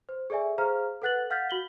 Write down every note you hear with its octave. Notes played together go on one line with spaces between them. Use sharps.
C5
G#4 A4 D5 E5 G#5
G#4 C5 F5 A#5 F6
A4 B4 F#5 F#6 A6 F#7
F5 F#5 F6 G6 A6 B6
F#4 F#7 G7